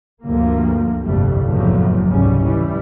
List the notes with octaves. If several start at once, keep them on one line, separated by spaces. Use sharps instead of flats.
D2 G2 F3 A#3
G1 C2 F2 G3 A3
F#1 E2 A2 F3 F#3
F1 C#2 G#2 C#3 G3 C#4
E3 G3